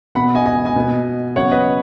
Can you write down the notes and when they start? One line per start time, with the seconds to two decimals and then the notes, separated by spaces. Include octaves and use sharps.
0.15 B2 B3 F#5 B5
0.35 D#5 G#5
0.46 D#5 G#5
0.65 D#5 G#5
0.76 B2 B3
1.35 C#3 F#3 B3 C#5 F#5
1.51 B4 D#5